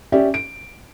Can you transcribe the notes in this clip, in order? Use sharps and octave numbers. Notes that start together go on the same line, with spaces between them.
C#4 G4 D5 E5
D7